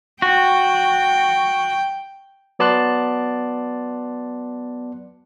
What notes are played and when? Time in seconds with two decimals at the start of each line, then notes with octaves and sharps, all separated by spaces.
0.22 F#4 G5
2.59 F#3 B3 D5 A5 C6 F#6